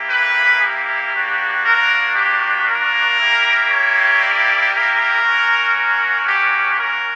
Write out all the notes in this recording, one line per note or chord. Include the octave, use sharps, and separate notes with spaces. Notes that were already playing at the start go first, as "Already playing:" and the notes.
Already playing: A#3 E4 G4
B4
G4
A#3 D4 F#4
A#4
G4
A#4
A#3 E4 G4
C#5
D5
A#4
A#3 C#4 F#4
A#4
G4
A#4